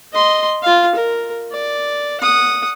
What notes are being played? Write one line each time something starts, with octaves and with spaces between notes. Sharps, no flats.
D#5 C6
F4 F5
A#4
D5
F#5 D#6